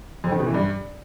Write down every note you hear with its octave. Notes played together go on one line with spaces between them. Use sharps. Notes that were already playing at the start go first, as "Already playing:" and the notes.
F2
D#3
B2
E3
G2